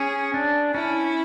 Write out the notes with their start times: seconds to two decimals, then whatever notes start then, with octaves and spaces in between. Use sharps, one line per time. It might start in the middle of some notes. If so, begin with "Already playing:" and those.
Already playing: C#4 G#4
0.34 D4
0.74 C#4 E4